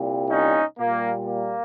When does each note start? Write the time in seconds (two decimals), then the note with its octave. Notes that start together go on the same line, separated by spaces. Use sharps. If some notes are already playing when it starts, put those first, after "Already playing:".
Already playing: C2 A#2 G3
0.29 C#4 D#4
0.78 A#2 G3 A#3
1.26 A#3